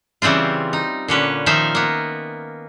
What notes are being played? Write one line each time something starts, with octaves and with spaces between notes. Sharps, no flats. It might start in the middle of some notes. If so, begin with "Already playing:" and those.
C#3 E3 G3 C4 F4
D#4
A#2 D3 C#4 B4
D#3 F3 D#4 E5 F5
A#3 B3